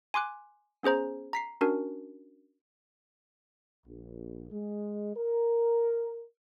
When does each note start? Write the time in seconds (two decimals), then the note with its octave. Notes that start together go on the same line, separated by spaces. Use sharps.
0.14 G#5 C6 D6 F#6
0.83 B3 C#4 G#4 C5 A#5
1.33 A#5 B6 C7
1.61 C#4 D4 F#4 A#4
3.86 A#1
4.51 G#3
5.17 A#4